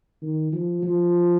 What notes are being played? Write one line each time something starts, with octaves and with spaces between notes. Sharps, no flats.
D#3
F3
F3